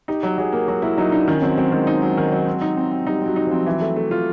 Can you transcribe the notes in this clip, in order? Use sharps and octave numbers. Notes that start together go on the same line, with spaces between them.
D#4 G4
F#3
F#3 G#4
A#3
F#3 F#4
A#3 E4
F#3 D#4
D4 D#4
D#3 C#4
F#3 C4
F#3 C4
D#3 G#3
D#4
F#3
D#3
F#3
C4
D#4
C4
C4
G3 D#4
F#3 C4
D#4
F3 C4
E3 F#3
A3
A3
F4